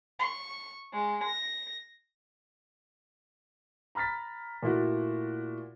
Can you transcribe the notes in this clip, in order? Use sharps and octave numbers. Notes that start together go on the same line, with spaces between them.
C#6
G#3
A#6
A#5 B5 F6 A6 B6
A#2 A3 E4 F#4